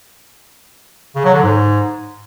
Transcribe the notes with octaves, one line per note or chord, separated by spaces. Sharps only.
C#3
F#3
D3
G#2